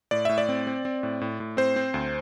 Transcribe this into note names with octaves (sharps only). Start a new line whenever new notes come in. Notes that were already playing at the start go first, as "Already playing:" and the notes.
A2 D5
A2 E5
D5
C4
C4
C4
A2
A2
A2
C4 C5
C4
D2